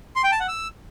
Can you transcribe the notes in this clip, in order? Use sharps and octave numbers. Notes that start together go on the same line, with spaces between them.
C6
G5
A5
F#5
E6